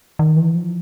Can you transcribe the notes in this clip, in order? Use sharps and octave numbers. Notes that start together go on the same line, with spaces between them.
D#3
E3
F3